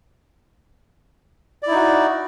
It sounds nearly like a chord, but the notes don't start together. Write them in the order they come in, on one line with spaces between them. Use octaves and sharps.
D5 E4 D#4 F#4